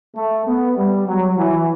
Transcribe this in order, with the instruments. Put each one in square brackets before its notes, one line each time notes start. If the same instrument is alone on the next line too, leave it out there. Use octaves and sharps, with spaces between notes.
[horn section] A3
B3
G3
F#3
E3